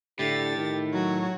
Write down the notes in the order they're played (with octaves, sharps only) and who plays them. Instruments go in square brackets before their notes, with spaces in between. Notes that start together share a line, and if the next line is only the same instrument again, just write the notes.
[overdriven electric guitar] A2 [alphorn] D3 [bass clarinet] G4 [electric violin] A6
[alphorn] D#3
[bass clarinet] F#3 [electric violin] F#4 C#5